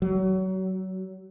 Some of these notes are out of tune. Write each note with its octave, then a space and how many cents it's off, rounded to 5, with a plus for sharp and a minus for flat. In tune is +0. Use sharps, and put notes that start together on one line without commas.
F#3 +25